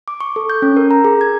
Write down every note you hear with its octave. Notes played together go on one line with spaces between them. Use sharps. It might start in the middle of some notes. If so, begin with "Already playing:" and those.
D6
C#6
A4
G6
C#4
A#4
A#5
G#4
G#6